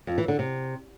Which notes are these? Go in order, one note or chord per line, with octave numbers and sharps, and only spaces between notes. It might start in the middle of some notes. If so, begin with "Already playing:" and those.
F2
E3
D3
C3